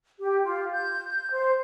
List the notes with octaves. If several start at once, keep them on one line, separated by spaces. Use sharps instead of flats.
G4
F4
G6
G6
C5